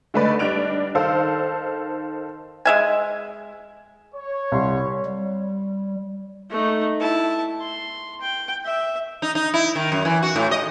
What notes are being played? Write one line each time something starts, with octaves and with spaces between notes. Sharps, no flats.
D3 G#3 A3 D#4 B4 D5
G3 D4 D#4 F#6 D7 F7
D#3 A4 C5 F5 E6
G#3 E5 G#5
C#5
C2 C6
G3
A3 D#4
E4 A5
C6
G5
E5
D#4
D#4
E4
D#3
F#2
E3
F#4
A2
D#5